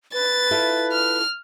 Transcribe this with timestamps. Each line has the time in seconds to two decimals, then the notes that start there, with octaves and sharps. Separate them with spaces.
0.13 B4 A6
0.51 E4 F4 A4
0.92 F6